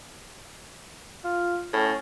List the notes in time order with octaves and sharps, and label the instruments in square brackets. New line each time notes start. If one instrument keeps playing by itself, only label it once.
[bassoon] F4
[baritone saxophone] A2 [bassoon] C#4